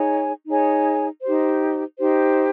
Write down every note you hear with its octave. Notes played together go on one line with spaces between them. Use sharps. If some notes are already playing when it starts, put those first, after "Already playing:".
Already playing: D#4 G#4 C#5 G#5
D#4 G#4 C#5 G#5
D#4 G4 C5
D#4 G4 C5